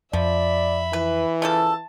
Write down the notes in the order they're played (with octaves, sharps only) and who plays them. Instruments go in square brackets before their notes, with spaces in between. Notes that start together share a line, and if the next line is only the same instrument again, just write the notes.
[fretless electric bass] F2 [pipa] F3 [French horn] D5 [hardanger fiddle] E5 B5
[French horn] E3 [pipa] B4
[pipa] C#3 F3 A4 [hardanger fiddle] A5